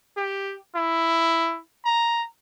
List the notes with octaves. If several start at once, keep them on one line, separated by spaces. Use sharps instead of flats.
G4
E4
A#5